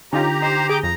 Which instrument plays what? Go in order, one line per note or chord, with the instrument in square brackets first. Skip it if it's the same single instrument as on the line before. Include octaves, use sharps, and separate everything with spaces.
[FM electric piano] D3 [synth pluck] C#4 D#4 F4 [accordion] G4 A#5
[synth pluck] D#4 [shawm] C5
[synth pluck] G#4 D#6 G6 [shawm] D6
[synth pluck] F2 [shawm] A#5